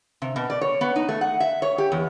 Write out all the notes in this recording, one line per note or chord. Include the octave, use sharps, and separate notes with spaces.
C3
B2
D5
C#5
B3
D#4
A3
F#5
E5
C#5
G4
E2